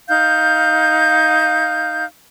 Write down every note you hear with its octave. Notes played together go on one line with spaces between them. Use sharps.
D#4 F5 G6